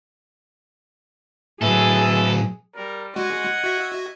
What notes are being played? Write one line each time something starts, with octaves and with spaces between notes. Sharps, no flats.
A2 F#3 G#4 A4 B4 E5
G3 A#4
G#3 F#4 D#5 F#5 G#6
F#4 E5